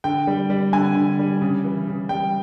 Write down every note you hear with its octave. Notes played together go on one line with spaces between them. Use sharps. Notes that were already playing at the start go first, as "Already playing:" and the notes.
D3 G5
G3
G3
D3 G#5
D3
G3
C#3
E3
C#3
G3 G5